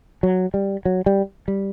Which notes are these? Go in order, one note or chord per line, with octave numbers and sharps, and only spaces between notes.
F#3
G3
F#3
G3
G3